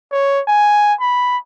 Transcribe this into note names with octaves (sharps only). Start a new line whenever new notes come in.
C#5
G#5
B5